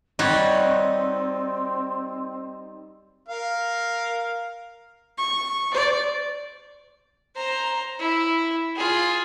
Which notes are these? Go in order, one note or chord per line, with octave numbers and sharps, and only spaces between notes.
G3 C4 D#4 F#4 C#5
A#4 F5
C#6
D5
C5 A#5
E4
F4 G#4